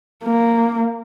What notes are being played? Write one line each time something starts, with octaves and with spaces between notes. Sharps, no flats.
A#3